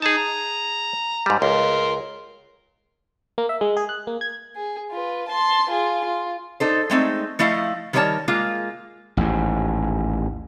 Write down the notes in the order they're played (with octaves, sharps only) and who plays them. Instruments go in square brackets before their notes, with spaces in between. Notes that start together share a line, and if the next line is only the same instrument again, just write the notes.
[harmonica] D#4 [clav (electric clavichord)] G#4 A5
[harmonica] A#5
[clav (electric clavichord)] G#2 G3
[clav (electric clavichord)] C#2 [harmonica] A#4 C6
[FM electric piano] A#3
E5
G#3
G#4
F#6
A#3
G#6
[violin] G#4
F4 B4
A5 C6
F4 G#4
F4
[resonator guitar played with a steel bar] D#4 A4 C5
G#3 A3 C4 D#4
F3 A3 E4 D#5 F5
D#3 G3 A#4 B4 C#5 A5
G#3 A#3 F4
[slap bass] A1 D#2 G#2